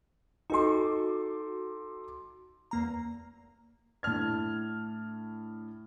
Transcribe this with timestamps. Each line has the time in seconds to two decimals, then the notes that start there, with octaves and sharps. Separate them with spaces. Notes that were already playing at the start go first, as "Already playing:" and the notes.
0.50 D#4 F#4 A4 C6 D6
2.71 E2 A#3 A#5
4.03 A2 D4 A5 F6 G#6